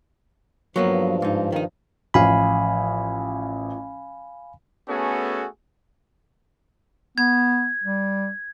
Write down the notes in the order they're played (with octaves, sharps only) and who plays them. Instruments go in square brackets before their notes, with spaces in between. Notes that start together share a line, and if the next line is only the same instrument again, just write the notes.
[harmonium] G2 F3 [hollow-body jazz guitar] F#3 A#3 B3
[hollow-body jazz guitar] G#2 D#4
D#3 D#4
[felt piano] A1 F3 [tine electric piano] F5 G#5 B5
[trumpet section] A3 B3 C#4 F#4 G#4 A4
[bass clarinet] B3 [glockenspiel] G#6
[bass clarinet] G3